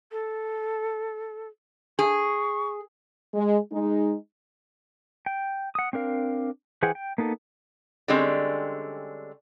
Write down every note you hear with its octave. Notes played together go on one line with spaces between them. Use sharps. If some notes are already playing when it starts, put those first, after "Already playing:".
A4
G#4 C#6
G#3
G#3 D#4
G5
F#5 D#6
C4 D4 A#4 F5
E3 G#4 C5 F#5 G5
G5
A#3 B3 D#4 A4
D3 G3 G#3 C4 C#4